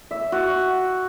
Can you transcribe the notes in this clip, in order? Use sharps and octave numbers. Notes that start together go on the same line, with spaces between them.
E5
F#4